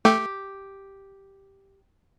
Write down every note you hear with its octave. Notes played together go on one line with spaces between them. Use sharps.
A3 G4